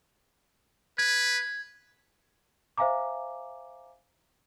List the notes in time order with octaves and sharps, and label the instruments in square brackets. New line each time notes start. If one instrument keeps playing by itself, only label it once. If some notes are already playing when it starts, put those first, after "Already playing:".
[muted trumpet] B4 [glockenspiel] G#6
[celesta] C5 E5 F5 G#5 A#5 D6